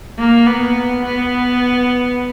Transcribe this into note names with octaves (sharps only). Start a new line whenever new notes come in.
A#3
B3
B3